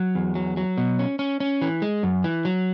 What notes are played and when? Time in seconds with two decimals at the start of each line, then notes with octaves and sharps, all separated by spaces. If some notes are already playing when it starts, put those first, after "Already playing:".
Already playing: F#3
0.15 E2
0.35 F#3
0.57 F#3
0.78 B2
0.99 C#4
1.19 C#4
1.40 C#4
1.62 E3
1.82 G#3
2.03 F#2
2.24 E3
2.45 F#3